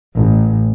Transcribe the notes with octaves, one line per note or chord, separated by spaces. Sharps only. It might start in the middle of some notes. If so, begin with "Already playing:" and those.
A1